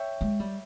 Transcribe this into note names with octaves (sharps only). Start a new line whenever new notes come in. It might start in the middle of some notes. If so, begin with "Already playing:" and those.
Already playing: C#5 E5 G5
G#3
G3